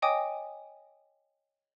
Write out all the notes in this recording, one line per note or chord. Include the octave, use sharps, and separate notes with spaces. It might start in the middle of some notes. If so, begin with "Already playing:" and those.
C#5 D#5 G5 G#5 D6 D#6